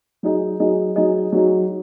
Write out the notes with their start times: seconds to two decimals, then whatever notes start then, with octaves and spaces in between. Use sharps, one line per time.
0.23 F#3 D#4 G#4 D#5
0.59 F#3 D#4 G#4 D#5
0.96 F#3 D#4 G#4 D#5
1.32 F#3 D#4 G#4 D#5